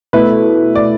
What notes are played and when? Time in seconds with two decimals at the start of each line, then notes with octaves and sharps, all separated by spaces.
0.13 B2 A3 E4 B4
0.75 D5